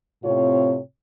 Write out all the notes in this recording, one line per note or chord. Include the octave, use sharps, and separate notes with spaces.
A2 C3 C4 F4 C#5